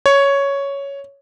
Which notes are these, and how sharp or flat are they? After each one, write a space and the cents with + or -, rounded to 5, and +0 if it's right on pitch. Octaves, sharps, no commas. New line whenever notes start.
C#5 +5